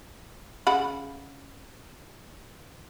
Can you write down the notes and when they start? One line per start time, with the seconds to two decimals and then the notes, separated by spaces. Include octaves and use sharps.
0.67 C#3 F#5 B5